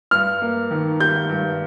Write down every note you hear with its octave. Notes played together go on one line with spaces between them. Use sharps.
G2 F6
A#3
D#3
G3 G6
G2